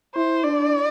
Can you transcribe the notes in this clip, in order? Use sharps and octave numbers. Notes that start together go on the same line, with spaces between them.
E4 C5
D4 D5